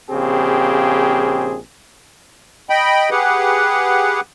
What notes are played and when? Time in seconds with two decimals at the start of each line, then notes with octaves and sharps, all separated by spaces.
0.11 A#1 C#3 C4 G4 G#4
2.70 D#5 G5 B5
3.11 G4 G#4 B4 F#5